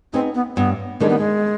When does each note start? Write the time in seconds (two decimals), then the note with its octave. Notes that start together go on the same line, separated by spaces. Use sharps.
0.13 B3 C4 D#4 G#4
0.35 B3
0.56 G2 B3
1.00 D#3 G3 G#3 D4
1.09 B3
1.18 G#3